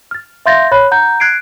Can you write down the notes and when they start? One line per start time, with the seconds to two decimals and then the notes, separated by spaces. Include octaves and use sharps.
0.11 F6 A6
0.46 E5 F5 C6 G6 A6 A#6
0.72 C#5 B5 F#6
0.91 F#5 A#5 G6
1.20 F#6 G#6 C7 D7